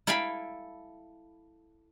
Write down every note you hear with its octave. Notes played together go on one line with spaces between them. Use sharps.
E4 A4 F5 G5 G#5 B5